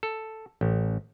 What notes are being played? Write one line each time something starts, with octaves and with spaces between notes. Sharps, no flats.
A4
A1